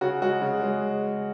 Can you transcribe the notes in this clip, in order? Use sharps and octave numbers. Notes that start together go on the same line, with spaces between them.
C#3 F#4
G#3 F#4
C#3
G#3